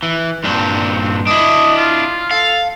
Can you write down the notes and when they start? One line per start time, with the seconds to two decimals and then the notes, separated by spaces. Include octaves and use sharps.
0.03 E3
0.44 G2 A#2 C4 D4
1.27 D4 E4 D#5
1.77 F4
2.31 A4 F5